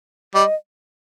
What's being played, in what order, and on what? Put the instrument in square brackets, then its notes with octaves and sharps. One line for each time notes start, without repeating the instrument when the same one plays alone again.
[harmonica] G3 [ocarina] D#5